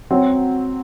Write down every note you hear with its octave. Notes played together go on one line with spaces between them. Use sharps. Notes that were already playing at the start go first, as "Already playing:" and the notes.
F#3 C4 F#4 C#5